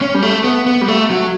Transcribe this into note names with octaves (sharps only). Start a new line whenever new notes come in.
C#4
G3
A3
B3
B3
G3
A3
F#3